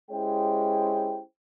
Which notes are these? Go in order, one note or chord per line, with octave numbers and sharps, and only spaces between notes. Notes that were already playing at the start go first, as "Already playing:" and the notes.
G#3 C#4 E4 G4 C5 G5